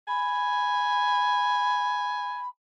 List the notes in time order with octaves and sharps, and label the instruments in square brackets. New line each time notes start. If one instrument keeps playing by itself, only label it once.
[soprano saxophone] G#5 [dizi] B5